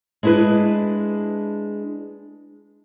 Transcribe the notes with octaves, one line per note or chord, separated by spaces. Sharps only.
G#3 D4 E4 G#4 B4